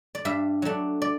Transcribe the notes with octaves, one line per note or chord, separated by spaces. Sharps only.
D5
G2 E5
F#3 A3 D4
D5